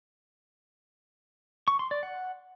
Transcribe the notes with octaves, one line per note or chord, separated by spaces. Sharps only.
C#6
C6
D5
F#5